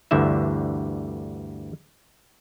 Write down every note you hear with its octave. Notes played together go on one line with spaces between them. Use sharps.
D2 G2 D3 E3 E5